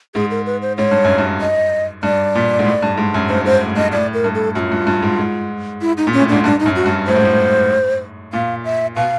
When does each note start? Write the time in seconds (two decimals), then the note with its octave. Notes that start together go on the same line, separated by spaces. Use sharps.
0.14 G#2 G#4
0.31 A#4
0.46 B4
0.62 C5
0.78 G#2 C#5
0.91 G2
1.04 F#2
1.18 G2
1.41 D#5
2.03 G2 D5
2.35 A#2
2.59 G#2
2.66 A2
2.82 G2
2.97 G#2
3.14 F#2
3.29 G2 C5
3.45 G#2 C5
3.61 A2
3.76 G2 D#5
3.92 A2 D5
4.13 A#4
4.24 G2
4.35 A4
4.55 F#2 F#4
4.59 F4
4.72 G2
4.87 G2
5.02 G#2
5.18 G#2
5.81 E4
5.97 D#4
6.07 A#2
6.13 C#4
6.19 A2
6.29 G#2 D4
6.44 G2 D4
6.60 D#4
6.66 F#2
6.76 F#4
6.86 G2
7.07 A2 C5
7.16 G#2
7.25 A2
8.33 A#2 F5
8.65 E5
8.96 B2 F5